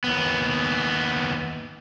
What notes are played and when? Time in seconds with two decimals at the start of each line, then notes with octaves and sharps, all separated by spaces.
0.04 D#2 B3